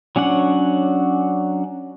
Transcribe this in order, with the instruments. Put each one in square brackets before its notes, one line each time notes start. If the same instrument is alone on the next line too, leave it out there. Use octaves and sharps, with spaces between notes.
[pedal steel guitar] F#3 C#4 D4 F#5